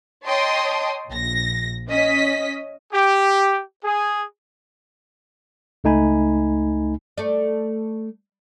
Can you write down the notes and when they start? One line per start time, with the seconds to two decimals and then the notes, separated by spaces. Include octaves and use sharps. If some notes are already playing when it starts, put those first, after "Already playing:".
0.25 C#5 D#5 G5 A5 C6 D#6
1.09 A#1 A#6
1.88 C#4 D#5 B6
2.92 G4
3.84 G#4
5.84 C#2 A3 D#4 G#5 B5
7.18 A3 D5